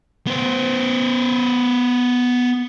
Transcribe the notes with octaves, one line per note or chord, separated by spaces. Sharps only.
B3 C5